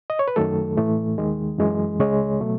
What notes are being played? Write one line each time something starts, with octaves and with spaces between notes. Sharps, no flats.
D#5
C#5
B4
F#2 D#3 F#3 A3 A4
A2 E3 A3
D#2 D#3 G#3
F#2 E3 G#3
C#2 C#3 G#3 C#5
B2 F#3 A3